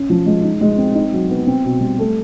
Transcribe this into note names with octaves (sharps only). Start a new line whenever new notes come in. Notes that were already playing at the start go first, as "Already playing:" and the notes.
Already playing: C#4
F3
G#3
D#4
G#3
C4
D#4
F#3
B3
C4
B2
G3
A3